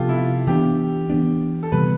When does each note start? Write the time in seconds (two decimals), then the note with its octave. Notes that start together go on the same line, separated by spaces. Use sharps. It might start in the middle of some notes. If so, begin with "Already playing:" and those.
Already playing: C3 F3 B3 D4 F4 G4 A4
0.09 E4
0.17 F4
0.47 E3 B3 D4 G4
1.10 E3 B3 D4
1.63 A4
1.72 C3 E3 G3 B3 B4